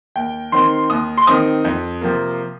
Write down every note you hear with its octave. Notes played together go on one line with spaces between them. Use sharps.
D#2 G5
D#3 C4 C6
D#2 D#6
C6
D#3 C4 D#6
F2
C3 F3 A#3